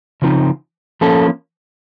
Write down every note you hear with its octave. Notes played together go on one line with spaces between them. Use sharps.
C#3 F3 C4 D#4
F3 A#3 C#4 A4